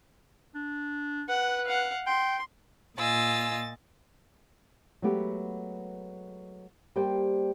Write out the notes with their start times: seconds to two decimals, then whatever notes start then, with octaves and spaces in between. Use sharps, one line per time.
0.55 D4
1.29 B4 F#5
1.66 F5 F#5
2.07 G5 C6
2.98 A#2 F4 D#5 G#5 E6 A6
5.02 F#3 G#3 A3 B3 G4
6.96 G3 A#3 G4 C5 G5